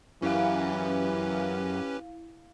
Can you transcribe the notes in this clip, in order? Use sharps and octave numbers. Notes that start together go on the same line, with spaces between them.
F#2 E3 C#4 E4 G4 B4 F5